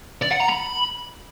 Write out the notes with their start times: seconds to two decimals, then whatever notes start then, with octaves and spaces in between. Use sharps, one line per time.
0.22 D5
0.31 F#5
0.40 A#5
0.49 B5